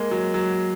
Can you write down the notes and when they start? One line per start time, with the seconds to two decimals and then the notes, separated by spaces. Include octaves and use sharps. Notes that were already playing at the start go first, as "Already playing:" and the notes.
Already playing: G#3 A#3
0.11 F#3
0.34 F#3